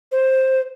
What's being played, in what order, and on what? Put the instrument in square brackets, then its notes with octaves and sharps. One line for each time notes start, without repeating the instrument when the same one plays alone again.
[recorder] C5